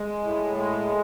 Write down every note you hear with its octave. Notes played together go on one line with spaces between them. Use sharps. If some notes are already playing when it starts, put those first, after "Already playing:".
Already playing: G#3
A2
G#3